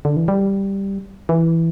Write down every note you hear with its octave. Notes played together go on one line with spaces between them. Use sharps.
D3
E3
G3
E3